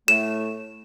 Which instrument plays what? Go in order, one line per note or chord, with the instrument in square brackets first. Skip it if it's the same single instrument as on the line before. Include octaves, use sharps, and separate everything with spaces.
[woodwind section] A2 A3 [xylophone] E7